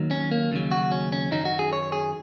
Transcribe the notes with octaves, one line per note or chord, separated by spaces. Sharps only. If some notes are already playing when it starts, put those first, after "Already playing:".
Already playing: D#2 D#3 F#3
C#4
A#3
D#2 C#3 F#3
F#4
C#4
C#4
F#2 D#3 F#3 D#4
F#4
G#4
C#5
G#4